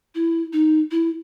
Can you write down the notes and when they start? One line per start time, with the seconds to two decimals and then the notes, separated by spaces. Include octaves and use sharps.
0.15 E4
0.53 D#4
0.91 E4